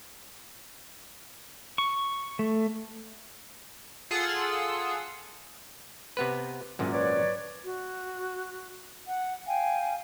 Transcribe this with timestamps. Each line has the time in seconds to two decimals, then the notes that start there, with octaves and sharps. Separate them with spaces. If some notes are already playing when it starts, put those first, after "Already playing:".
1.78 C#6
2.39 A3
4.11 F4 G#4 A4 F#5 C6 E6
6.17 C3 B3 B4
6.79 G#1 F#2 A#2
6.92 B4 C#5 D5
7.63 F#4
9.06 F#5
9.46 F5 G5 G#5